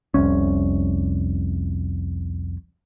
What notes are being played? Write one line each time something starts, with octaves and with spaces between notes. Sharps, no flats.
F1 C2 C#4